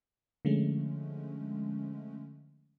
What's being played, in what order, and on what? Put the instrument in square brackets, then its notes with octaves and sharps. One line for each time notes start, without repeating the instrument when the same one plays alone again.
[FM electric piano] D3 F3 G#3 A3 C#4